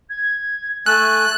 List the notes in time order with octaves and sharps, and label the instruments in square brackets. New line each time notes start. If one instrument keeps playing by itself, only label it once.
[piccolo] G#6
[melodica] A3 G#5 E6 [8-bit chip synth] F#6 [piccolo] A6